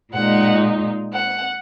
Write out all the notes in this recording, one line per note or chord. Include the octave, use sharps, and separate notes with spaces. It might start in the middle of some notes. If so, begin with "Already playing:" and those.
A#2 G#3 D#4 F#5
F#5